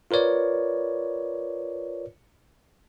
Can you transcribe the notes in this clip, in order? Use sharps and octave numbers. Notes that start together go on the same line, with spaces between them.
F4 A#4 B4 C#5 D5